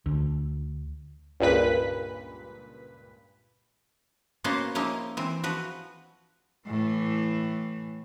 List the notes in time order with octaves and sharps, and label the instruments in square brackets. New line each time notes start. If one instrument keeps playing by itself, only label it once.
[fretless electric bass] D2
[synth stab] C#2 G2 A#2 B4 B6
[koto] A#3 B3 C#4 F#4 C5 F5
F3 A#3 C#4 D#4 E4
E3 C4
F3 F#4 B4
[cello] A2 E3